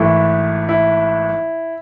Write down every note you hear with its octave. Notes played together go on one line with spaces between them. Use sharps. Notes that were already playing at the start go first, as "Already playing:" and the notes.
Already playing: G#1 G#2 E3 A3 E4
E4